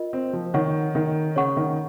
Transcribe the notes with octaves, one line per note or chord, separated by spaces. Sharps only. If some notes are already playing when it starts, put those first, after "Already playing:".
Already playing: F4 A#4 D#5
C4
F3
D#3 C#5 F#5 C#6
D#3
C#3 C#5 F#5 C#6
D#3